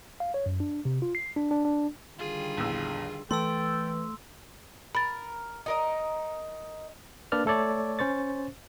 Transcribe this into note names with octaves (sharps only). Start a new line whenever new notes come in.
F5
C#5
F#2
D4
C3
F4
C7
D4
D4
D4
D3 D#3 G3 F4 G#4
A#1 E2 E6
E3 A3 A4 G5 C6 E6
A#4 B5 A6
D#4 A#4 D#5
A#3 D4 B4 D5 F6
A3 A4 C#5 D5
C#4 C5 C#6 A6